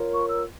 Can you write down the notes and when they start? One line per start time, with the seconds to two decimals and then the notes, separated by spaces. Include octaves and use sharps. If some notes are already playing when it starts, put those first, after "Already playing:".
Already playing: F4 A#4 C#5
0.11 C#6
0.28 E6